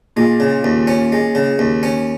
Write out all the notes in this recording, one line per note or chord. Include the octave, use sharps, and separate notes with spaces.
A#2 G#3
C#3
D#2
C#4
G#3
C#3
D#2
C#4